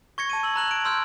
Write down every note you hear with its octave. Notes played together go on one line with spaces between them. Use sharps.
C#6 G#6 A#6 C#7
A5 C#6 D#7
E6 F#7
A#5 F#6 F#7
D7
C6 E6 F6 G6